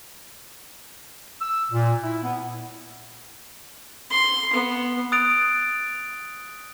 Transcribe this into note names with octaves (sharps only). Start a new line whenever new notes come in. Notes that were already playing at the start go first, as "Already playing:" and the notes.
E6
A#2
E4
B3
C6
B3
D#6 F#6 A6 D7 F7